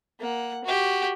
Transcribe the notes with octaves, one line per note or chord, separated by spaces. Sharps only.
A#3 F#5
F#4 G4